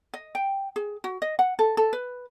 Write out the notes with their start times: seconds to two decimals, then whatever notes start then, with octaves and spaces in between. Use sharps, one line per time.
0.14 D#5
0.35 G5
0.76 G#4
1.04 F#4
1.22 D#5
1.39 F#5
1.59 A4
1.77 A4
1.93 B4